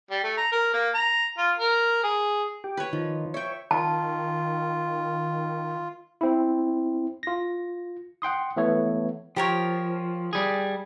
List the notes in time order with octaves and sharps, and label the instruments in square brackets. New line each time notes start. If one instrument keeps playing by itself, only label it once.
[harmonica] G3
A3
A#5
A#4
A#3
A#5
F4
A#4
G#4
[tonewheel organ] G4
[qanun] B4 C#5
[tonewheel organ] D#3 [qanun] F3
[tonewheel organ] C#5 [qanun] E5 G5
[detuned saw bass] D#3 [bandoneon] F4 [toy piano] A5
[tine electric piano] C4 E4
F4 A#6
F#5 G5 C6 D#6
E3 A3 B3 A4 C#5
[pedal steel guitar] F3 [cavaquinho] G4 A#4 C#5
[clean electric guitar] G3 G#4